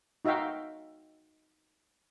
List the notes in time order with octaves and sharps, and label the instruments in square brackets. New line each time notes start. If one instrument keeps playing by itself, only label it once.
[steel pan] D#4 F#4 E5 F5 G5